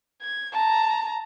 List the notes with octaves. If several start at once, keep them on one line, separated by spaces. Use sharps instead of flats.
G#6
A5 A#5